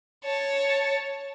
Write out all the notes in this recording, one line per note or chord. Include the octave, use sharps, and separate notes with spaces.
C#5 A5